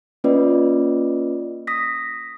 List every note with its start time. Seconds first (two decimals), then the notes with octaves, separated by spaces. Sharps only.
0.24 A#3 C#4 F4 B4 D5 D#5
1.67 D#6 A#6 B6